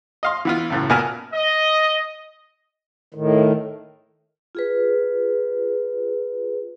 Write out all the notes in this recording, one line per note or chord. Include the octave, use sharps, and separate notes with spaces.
D#5 F5 C6
E3 B3 F4
C#2 F#2 A2
A#2 B3 A#4 G#5 A5 F6
D#5
A2 D#3
F4 G#4 B4